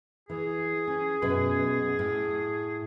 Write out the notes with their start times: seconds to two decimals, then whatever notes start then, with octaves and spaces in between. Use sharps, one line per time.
0.30 E3 G#4
0.87 C#4
1.22 F#2 B2 B4
1.99 A2